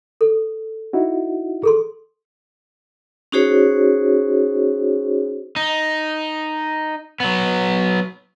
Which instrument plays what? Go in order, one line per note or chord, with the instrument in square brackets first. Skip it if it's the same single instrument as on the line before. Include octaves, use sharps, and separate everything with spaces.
[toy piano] A4
[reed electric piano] D#4 E4 F#4
[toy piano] G#4 A4 C6
[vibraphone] C#4 D#4 F#4 G#4 C5 C#5
[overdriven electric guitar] D#4
F#3 B3